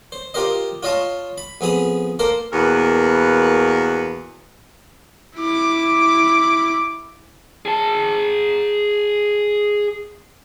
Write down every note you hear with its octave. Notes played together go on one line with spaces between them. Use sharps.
C5
F4 G4 A#4 C5 D#5
F4 C#5 D#5 F5 A5
B5
F2 B3 G#4 B5 D#6
A#3 A4 A#4 C5
E2 B2 A#3 A#4 B4
E4 D6
G#4 A5